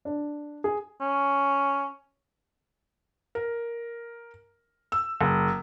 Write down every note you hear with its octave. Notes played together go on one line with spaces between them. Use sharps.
D4
G#4
C#4
A#4
E6
F#1